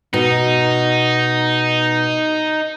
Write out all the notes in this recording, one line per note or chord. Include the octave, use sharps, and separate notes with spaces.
B2 D#4